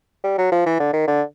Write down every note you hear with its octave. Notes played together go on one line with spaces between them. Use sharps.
G3
F#3
F3
E3
D3
D#3
D3